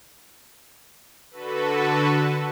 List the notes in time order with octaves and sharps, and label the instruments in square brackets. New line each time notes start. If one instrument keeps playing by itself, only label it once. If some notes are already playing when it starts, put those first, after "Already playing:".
[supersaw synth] D3 F#4 A4 B4